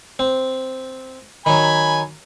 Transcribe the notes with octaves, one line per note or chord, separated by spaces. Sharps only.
C4
D#3 F#3 G#5 B5